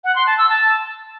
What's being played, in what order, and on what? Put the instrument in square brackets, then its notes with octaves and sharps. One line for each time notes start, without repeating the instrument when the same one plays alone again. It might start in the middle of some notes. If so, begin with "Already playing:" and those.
[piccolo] F#5
C6
A5
E6
A5